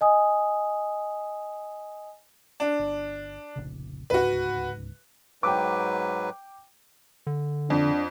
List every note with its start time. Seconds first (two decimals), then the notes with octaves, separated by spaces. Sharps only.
0.01 D#5 G#5 D#6
2.60 D4
2.79 G1
3.56 F1 A#1 C#3
4.10 D1 C#2 G#2 F#4 B4
5.43 G#2 F#3 B4 G5 D6
7.27 D3
7.70 F2 D4